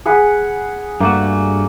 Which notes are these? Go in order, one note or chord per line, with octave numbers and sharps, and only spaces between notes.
G#4 F#5 B5
G2 A3 A#3 F#4